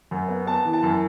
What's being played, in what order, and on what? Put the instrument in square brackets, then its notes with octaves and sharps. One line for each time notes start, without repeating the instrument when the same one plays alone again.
[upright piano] F#2
B3
B3 A5
E3
A5
F#2